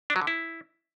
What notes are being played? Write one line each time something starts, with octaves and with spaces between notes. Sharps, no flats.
D4
F#3
D3
E4